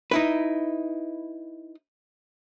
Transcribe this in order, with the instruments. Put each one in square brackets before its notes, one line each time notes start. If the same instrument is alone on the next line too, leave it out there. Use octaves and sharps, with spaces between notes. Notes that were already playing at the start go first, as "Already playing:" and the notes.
[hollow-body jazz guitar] D#4 E4 B4